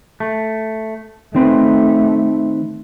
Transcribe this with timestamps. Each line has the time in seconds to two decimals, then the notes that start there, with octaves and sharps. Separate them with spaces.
0.20 A3
1.35 D#3 A3 C4 B4